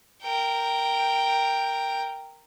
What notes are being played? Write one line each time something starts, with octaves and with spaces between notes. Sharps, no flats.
A#4 G5